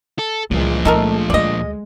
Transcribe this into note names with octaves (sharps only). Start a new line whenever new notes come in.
A4
C#2 A#2 E3 F3 G3 G#3
G#3 A3 C4 D#4 A4 A#4
D2 G3 G#3 D5 D#5